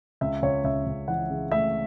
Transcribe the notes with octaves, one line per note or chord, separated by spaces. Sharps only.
C#2 E5
C#2 C#5
C#2 E5
C#2
E3 F#5
C#3
A3 E5